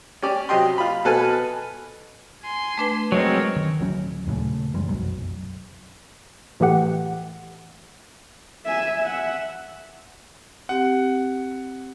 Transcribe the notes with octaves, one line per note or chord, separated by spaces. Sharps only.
C#4 G4 D5
C3 F#3 G4 D#5 G5 C6
F4 B5
B2 A4 B4 G#5 F6
G#5 C6
A3 D4 B4
F#3 G#3 C4 A#4 C#5
D#3
D1 D2 F#3 C#4
D#2 A#2 C#3 A3
F#2 E3 G3 G#3
F1 B1 F#2
A2 E3 A3 G4 F#5
E5 G#5
E5 F#5
C4 G4 F#5